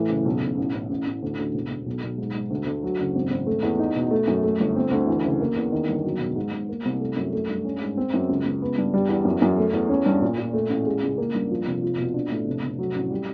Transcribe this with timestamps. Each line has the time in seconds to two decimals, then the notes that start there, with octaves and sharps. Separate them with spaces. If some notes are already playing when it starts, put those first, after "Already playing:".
Already playing: A2 E3
0.09 F#1
0.25 B1
0.42 B1
0.58 A1
0.74 A1
0.90 A1
1.07 A1
1.22 D2
1.38 D2
1.54 E1
1.71 E1
1.86 B1
2.03 B1
2.18 G#2
2.34 G#2
2.50 D2
2.66 D2
2.83 F#3
2.99 F#1
3.15 G#1
3.31 G#1
3.47 A3
3.63 E2
3.79 D#4
3.96 B2
4.11 A3
4.28 F#2
4.44 A3
4.60 G1
4.76 C4
4.91 D2
5.07 E3
5.24 F#1
5.41 A#3
5.56 E2
5.72 D#3
5.89 G1
6.04 F#3
6.20 E1
6.36 G#2
6.52 G#2
6.69 A#3
6.85 C2
7.00 A3
7.17 F#2
7.33 A3
7.49 G2
7.65 C#4
7.81 G#2
7.97 C4
8.14 F#2
8.29 C#2
8.45 C#2
8.62 B3
8.78 G2
8.94 G3
9.09 E2
9.25 F#2
9.42 F#2
9.58 A3
9.73 E2
9.89 C#4
10.06 G2
10.22 A#2
10.38 A#2
10.53 A3
10.70 A1
10.86 G#3
11.03 C#2
11.18 A#3
11.34 G2
11.51 F3
11.67 F1
11.83 F4
11.99 B2
12.14 D4
12.31 A2
12.47 F1
12.63 F1
12.79 F#3
12.95 A1
13.11 G3